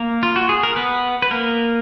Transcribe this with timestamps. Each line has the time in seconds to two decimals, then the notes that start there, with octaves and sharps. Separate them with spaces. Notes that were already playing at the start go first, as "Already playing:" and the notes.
Already playing: A#3 A#4
0.23 F4
0.36 F#4
0.49 G#4
0.63 A#4
0.76 B3 B4
1.22 B4
1.31 A#3 A#4